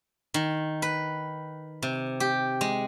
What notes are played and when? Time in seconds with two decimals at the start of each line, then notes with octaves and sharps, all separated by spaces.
0.34 D#3
0.82 B4
1.83 C3
2.20 G4
2.61 G#3